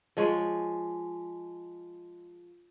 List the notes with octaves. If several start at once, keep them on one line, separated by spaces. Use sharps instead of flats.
F3 G#3 C#5